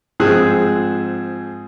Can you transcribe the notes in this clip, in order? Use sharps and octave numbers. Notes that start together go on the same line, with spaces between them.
G#2 F3 C4 G#4 E6 F#6